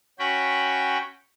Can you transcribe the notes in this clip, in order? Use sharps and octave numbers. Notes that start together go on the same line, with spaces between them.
C#4 F#4 G5 B5